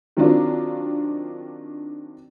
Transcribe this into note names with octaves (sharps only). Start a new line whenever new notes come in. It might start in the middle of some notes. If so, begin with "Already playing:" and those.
D#3 F#3 C4 D4 F4